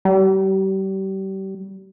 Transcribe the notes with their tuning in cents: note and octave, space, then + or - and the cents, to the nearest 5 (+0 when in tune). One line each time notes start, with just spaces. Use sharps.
G3 -35